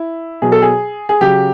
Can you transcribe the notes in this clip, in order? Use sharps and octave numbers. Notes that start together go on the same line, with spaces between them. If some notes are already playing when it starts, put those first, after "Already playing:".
Already playing: E4
B2 F#3 G#4
A4
G#4
G#4
C#3 F#3 G4